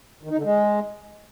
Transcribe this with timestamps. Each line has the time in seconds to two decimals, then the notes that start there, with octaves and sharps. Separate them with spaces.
0.23 D#3
0.30 D#4
0.37 D3
0.44 G#3